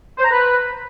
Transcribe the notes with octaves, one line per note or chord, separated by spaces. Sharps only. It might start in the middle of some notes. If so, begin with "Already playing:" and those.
C5
A#5
B4